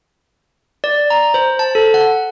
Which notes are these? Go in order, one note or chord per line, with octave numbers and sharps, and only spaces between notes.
D5
A#5
C5
A5
A4
F#5